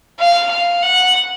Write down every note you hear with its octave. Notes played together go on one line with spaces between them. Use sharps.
F5
F5
F#5